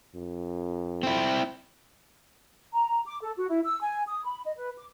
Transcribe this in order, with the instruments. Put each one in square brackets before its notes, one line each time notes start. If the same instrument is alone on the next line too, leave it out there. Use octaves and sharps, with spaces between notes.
[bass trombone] F2
[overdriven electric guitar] C4 E4
[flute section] A#5
D6
A4
F#4
E4
E6
G#5
D#6
B5
D#5
B4
D6